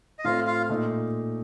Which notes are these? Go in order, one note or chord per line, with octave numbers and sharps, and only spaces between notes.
D#5
A2 A3 C4 F4 F5
F4 F5
A#2 A3 D#4